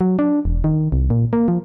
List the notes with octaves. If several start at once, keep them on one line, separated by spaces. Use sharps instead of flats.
F#3
D4
E1
D#3
C2
A#2
A#3
F3